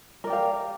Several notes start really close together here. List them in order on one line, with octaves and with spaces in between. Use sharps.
A#4 D5 G4 F5